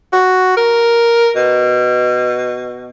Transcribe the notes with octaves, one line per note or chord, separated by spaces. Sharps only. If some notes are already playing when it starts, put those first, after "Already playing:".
F#4
A#4
B2